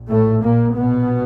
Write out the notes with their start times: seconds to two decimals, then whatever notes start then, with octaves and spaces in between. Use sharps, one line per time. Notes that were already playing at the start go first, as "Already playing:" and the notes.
Already playing: A#1
0.08 A2 A3
0.42 A#2 A#3
0.77 B2 B3